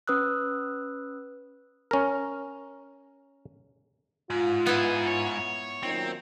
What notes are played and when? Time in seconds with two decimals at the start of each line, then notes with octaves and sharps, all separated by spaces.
0.07 C#4 B4 D#6 E6 F#6
1.91 C#4 A#4
4.30 G#2 F4
4.66 B3 D#4 E4 G#4
5.07 C#5
5.83 F#2 A#2 D#3 C4